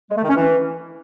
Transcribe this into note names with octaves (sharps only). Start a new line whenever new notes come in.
G#3
A3
D#3
C#4
E3